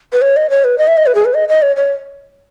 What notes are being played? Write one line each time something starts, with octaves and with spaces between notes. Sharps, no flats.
B4
C#5
D#5
C#5
B4
D#5
E5
D#5
B4
G#4
B4
D#5
D#5
C#5
C#5